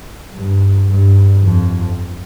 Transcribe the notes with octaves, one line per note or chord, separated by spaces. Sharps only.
G2
G2
F2